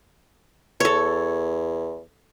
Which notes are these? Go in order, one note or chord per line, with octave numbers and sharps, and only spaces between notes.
E2 A4 C#5